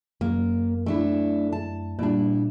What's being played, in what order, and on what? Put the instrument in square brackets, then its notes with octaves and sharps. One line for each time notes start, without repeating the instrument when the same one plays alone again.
[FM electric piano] F#2 [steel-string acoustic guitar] A#3
[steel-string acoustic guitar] A3 D4 E4
A5
[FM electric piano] A#2 G3 [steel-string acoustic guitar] D4 E4